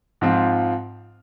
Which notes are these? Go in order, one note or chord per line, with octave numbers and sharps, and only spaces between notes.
G#2 F3 C4 F4